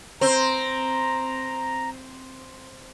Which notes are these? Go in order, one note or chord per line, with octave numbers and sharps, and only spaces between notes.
C4 A#5